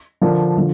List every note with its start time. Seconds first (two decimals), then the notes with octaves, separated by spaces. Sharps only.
0.21 D3 F3 D4 A#4 D5
0.57 D3 F3